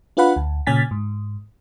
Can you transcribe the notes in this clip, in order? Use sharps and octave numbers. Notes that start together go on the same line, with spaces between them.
D4 F4 B4 F5 F#5 B5
D2
A#2 C#3 C#4 G#5 A6 B6
G#2